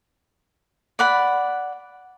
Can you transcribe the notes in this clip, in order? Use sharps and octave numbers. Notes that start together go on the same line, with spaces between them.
D5 F#5 B5